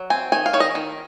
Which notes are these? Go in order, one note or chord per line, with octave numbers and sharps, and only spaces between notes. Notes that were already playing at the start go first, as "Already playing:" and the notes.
Already playing: F#3
C4 G#5
D#3 G#5
F5
D#3 C#5
D#5
D#3